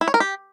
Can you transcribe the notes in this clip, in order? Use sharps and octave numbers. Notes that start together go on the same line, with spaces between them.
E4
C#5
A#4
G4